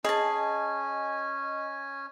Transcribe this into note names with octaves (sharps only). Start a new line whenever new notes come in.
C#4 G#4 D#5 G#5 A5